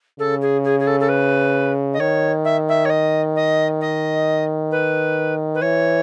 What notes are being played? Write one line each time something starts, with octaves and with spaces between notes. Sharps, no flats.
C#3 A4
G#4
G#4
G#4
A4
A4
B4
D#5
D#3 C#5
E5
E5
C#5
D#5
D#5
D#5
B4
B4
E3 C#5